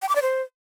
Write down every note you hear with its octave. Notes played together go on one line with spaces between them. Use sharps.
G5
D6
D5
C5